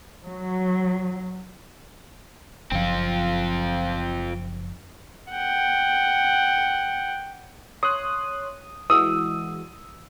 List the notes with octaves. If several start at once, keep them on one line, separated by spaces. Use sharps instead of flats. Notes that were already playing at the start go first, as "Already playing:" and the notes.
F#3
F#1 F3 C4 F4
F#5 G5
C#5 C6 D#6 F#6
E3 G#3 F#4 D#6 E6